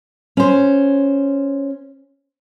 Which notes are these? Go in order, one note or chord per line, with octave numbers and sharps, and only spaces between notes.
C#4 C5